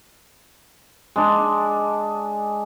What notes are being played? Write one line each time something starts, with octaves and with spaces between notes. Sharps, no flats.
G#3 D4